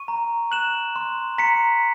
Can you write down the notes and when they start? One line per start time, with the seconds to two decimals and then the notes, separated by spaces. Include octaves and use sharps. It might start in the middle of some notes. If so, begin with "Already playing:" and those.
Already playing: C#6 D#7
0.08 A#5
0.51 F#6 E7 F#7
0.96 C6
1.38 A#5 B6 C#7